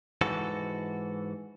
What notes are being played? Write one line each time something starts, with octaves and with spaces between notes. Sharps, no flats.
G#2 E3 F#4 A4